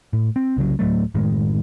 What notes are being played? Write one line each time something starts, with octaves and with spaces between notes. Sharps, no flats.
A2
C4
C2 C#3 F#3
D1 A2 F#3 A3
F#1 A2 D#3 G#3